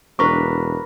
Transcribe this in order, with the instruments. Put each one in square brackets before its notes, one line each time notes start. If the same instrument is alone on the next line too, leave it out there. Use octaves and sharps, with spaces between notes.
[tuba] E1 [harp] D4 A#4 B4 [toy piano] C#6